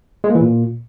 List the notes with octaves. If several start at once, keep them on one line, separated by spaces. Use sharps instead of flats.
G#3
A#3
E3
A#2